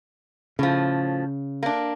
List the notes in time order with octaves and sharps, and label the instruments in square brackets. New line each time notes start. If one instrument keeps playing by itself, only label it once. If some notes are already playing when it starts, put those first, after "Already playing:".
[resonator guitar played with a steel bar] A2 F3 [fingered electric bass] C#3
[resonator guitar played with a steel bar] A#3 D4